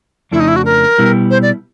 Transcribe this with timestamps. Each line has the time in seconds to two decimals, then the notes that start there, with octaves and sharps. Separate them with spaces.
0.31 F2 C#3 F3 A3 D4 E4
0.40 D#4
0.48 E4
0.56 F#4
0.65 A#4
0.98 B2 G3 B3 E4 G4
1.30 C5
1.42 D5